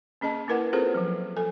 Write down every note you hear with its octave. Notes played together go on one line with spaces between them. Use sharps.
A#3 C#4 G#4 D#5 A5
A#3 E4 A#4 B4 F#5
C4 F4 G#4 A4 B4 C5
F3 F#3
A4 G#5